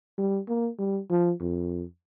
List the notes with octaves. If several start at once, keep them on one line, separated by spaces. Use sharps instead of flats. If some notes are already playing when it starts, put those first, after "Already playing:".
G3
A#3
G3
F3
F2